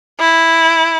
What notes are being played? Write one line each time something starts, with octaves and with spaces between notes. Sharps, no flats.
E4